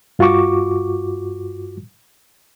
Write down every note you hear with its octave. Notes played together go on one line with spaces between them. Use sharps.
G2 F4 F#4 C#6 D6